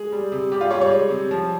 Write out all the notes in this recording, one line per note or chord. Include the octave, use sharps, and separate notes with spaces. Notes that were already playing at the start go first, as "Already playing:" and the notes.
Already playing: G#3 G#4
G3
C3
G3 G4
F4
G3 C#5
C#5
G#3
C3
F3